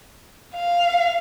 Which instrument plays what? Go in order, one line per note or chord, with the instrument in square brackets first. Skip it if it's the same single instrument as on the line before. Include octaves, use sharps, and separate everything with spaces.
[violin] F5